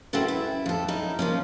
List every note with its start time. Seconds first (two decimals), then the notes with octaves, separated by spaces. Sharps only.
0.13 C4 C#4 E4 F#4 A4 B4
0.28 E4
0.66 F2 A4
0.88 C#4 D#4 E4
1.19 F3 A#3 C#4